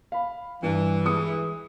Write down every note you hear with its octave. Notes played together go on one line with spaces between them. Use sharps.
F5 B5
G2 E3
G#3 D#6 C#7